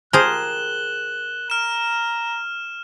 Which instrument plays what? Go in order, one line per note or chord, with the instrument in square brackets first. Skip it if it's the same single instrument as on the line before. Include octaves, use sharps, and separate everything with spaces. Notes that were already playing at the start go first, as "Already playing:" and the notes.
[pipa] F3 G4 C5 [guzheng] G#4 A#4 [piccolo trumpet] F#6 [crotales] E7 G7
[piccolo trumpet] A#5 [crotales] F6 E7